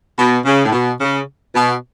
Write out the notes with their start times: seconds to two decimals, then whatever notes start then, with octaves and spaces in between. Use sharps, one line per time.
0.19 B2
0.46 C#3
0.66 A2
0.73 B2
1.01 C#3
1.55 B2